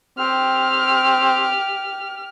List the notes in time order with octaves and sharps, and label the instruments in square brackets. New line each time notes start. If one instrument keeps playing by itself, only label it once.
[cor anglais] C4 [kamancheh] G4 F6